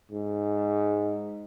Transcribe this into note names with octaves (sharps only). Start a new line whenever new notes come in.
G#2